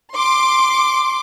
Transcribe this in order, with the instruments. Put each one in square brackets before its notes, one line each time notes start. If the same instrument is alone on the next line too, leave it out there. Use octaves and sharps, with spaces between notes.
[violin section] C6 D6